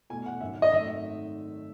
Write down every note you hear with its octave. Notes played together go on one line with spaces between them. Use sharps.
E2 B2 A3 G#5
F#5
G#1 F#2 D#3 E5
D#5
G#1 F#2 D#3 A3 E5